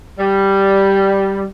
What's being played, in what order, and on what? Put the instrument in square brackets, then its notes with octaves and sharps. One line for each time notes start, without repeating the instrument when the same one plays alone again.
[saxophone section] G3